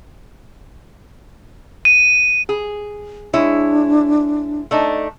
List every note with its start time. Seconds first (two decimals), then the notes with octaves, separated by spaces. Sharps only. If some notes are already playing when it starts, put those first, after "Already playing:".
1.85 D#7
2.49 G#4
3.33 G#3 D4 E4 C#5
4.71 A3 D4 D#4